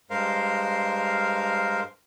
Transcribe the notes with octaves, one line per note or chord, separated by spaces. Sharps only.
G2 G#3 A#4 C5 F5